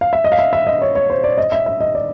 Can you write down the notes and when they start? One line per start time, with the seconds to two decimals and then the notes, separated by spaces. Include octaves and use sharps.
0.01 F5
0.13 E5
0.24 D#5
0.32 F5
0.39 E5
0.53 E5
0.67 D#5
0.82 C#5
0.95 C#5
1.10 C5
1.24 D5
1.38 D#5
1.52 E5
1.66 E5
1.81 D#5
1.95 D5